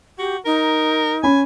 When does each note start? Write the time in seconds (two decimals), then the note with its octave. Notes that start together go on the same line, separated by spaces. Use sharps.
0.19 F#4 G4
0.45 D#4 A#4
1.24 C#4 G#5 B5